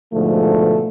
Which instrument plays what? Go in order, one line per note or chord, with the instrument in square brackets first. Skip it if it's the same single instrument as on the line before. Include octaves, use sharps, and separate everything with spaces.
[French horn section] G#2 B2 D3 F3 A3